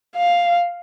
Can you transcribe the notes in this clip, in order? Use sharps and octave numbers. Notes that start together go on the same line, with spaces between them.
F5